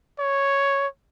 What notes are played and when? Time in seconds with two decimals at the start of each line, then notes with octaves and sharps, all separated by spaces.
0.19 C#5